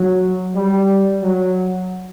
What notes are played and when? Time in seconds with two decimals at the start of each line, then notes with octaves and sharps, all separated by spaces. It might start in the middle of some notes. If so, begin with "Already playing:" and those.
Already playing: F#3
0.55 G3
1.23 F#3